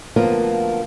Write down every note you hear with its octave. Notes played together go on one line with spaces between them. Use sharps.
D2 F3 A#3 B3 F4 A#4